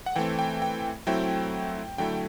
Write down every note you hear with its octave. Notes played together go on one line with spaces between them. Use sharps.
F#5
E3 A3 C4 G5
G5
G5
F#3 A3 C4 E4 G5
D3 F#3 A3 E4 G5